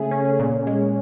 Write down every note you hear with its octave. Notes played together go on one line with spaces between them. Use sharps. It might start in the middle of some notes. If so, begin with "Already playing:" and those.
Already playing: C#3 A3 G#4
C#4
A#2
G#3